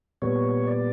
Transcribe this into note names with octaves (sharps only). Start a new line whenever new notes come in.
A#2 G3 B3 C#5
D5